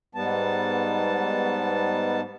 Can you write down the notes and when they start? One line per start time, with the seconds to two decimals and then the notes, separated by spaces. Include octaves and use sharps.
0.15 G#2 G3 B3 A5